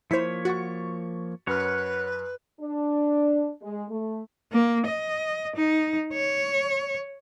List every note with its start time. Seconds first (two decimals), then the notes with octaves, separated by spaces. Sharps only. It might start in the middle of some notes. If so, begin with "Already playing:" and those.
0.11 F3 A#3 E4 C5 C#5 G#6 B6 C#7
0.45 F#4 C#6 A6 C#7
1.47 F#2 B4 C#5 F#5 B5 F6
2.60 D4
3.62 G#3
3.90 A3
4.52 A#3
4.86 D#5
5.56 D#4
6.13 C#5